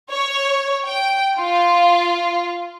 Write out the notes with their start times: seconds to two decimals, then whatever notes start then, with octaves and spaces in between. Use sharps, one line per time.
0.11 C#5
0.87 G5
1.39 F4